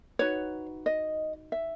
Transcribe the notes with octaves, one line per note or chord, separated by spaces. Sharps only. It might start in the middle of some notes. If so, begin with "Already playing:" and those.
D#4 F#4 B4 C#5
D#5
E5